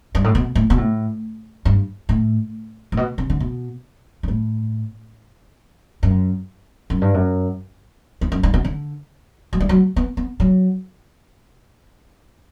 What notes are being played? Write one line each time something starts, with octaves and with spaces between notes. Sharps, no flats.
G2
A2
B2
A2
B2
A2
G2
A2
A2
B2
C3
D3
B2
G2
A2
F#2
F#2
G2
F#2
E2
F#2
G2
B2
D3
F#3
G3
F#3
B3
B3
F#3